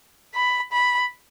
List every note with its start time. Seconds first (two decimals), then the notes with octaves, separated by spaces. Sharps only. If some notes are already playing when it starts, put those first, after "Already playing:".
0.35 B5
0.72 B5